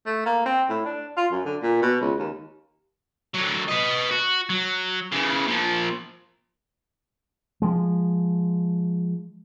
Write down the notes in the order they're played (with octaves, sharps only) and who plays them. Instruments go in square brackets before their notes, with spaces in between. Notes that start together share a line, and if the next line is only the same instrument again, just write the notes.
[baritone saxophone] A3
A#3
C4
A2
D4
F4
F#2
D3
A#2
B2
C#2
D#2
[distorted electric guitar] D3 F#3
B4 D#5
F#4
F#3
C#3 E3
A#2 F3
[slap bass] F3 G#3